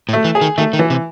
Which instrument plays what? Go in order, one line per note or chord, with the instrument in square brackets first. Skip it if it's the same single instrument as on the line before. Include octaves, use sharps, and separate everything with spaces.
[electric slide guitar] A2
[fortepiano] A3
[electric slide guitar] E3
[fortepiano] G#4
[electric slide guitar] D#3
[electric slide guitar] D#3 [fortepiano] A3
[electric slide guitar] D#3
[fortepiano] E3
[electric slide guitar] C3